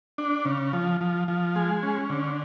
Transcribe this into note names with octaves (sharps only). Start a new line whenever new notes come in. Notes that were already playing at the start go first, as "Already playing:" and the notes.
D4
C#3
F3
F3
F3
G#3
C#4
D3